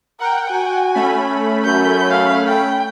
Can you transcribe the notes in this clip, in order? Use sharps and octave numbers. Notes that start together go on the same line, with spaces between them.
A#4 F#5 G5
F#4 G#5
A3 C#4 B5
F#2 G6
F5
G5